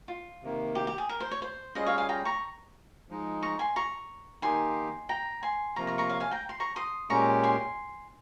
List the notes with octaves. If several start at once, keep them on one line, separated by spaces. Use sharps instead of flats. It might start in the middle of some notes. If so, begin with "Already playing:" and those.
F4
C3 D#3 A#3
G4
G4
G#4
A#4
C5
C#5
C5
G3 C#4 F4 G#4 C5 D#5
C#5 F5
F5 G#5
G5 A#5
A#5 C#6
F3 G#3 D#4
A#5 C#6
G#5 C6
A#5 C#6
D#3 A#3 D#4 G4 G#5 C6
G5 A#5
G#5 C6
C3 F3 A#3 F4 A#5 C#6
A#5 C#6
A#5 C#6
C#5 F5
F5 G#5
G5 A#5
C6
A#5 C#6
C6 D#6
A#2 G#3 C#4 G4 A#5 C#6
G#5 C6